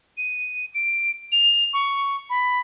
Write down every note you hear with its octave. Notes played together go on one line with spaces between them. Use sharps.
D#7
D7
F7
C#6
B5